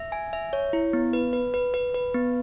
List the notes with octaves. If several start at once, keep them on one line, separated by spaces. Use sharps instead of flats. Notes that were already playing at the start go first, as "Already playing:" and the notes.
Already playing: E5
G#5
E5
C#5
E4
B3
B4
B4
B4
B4
B4
B3